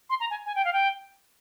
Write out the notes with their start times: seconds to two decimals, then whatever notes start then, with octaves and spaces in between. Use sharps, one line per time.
0.10 C6
0.20 A#5
0.31 G#5
0.46 G#5
0.56 G5
0.65 F5
0.73 G5